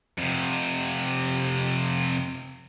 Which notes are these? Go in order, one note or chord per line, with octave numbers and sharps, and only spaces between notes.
F2 C3